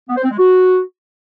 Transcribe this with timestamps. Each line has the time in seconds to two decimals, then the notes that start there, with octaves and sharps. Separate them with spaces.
0.09 B3
0.16 C5
0.23 C4
0.31 G#3
0.38 F#4